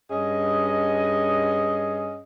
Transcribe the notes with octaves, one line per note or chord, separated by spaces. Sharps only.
G2 C#4 G#4 D#5